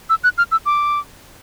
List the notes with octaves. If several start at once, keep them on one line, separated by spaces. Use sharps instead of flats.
E6
F#6
F6
E6
D6